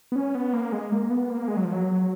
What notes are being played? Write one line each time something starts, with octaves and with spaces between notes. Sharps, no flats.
B3
C#4
B3
A#3
G#3
A#3
B3
A#3
G#3
F#3
F3
F#3